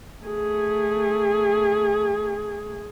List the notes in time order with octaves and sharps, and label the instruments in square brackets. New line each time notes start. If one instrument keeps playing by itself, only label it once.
[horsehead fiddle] A3 G#4